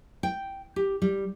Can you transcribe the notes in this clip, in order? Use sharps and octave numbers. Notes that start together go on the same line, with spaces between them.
G5
G4
G3